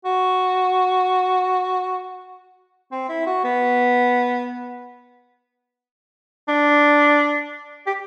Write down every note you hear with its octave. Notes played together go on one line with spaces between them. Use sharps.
F#4
C4
E4
F#4
B3
D4
G4